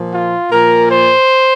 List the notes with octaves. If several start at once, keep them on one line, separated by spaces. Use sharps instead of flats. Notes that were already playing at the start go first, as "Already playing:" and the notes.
Already playing: A#2 F3
F4
A#2 F3 A#4
C5